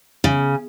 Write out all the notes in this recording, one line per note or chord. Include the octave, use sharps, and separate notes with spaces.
C#3